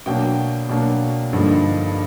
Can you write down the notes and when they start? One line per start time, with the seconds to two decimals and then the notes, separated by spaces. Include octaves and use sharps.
0.06 B2 F#3 A#3 D4 G5
0.69 B2 F#3 A#3 D4
1.33 G2 D3 F3 A#3 D#4